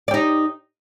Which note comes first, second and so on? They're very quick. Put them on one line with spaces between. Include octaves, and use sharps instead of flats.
D5 G4 D#4